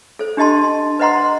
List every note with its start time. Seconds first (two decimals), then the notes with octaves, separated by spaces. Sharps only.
0.19 A4 C5
0.37 D4 G4 D#5 A5 C6
0.99 B4 C5 D#5 F#5 A#5 C6